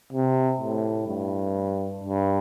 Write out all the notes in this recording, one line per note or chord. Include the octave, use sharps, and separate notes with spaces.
C3
A2
G2
G2